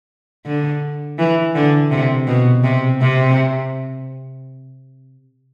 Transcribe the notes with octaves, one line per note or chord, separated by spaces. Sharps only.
D3
E3
D3
C3
B2
C3
C3